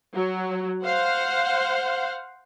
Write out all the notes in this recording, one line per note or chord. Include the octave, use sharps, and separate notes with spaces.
F#3
C5 F5 F#5